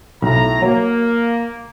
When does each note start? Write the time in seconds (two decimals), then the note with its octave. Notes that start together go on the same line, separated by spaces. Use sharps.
0.22 B1 A2 A#5
0.62 F#3 A#3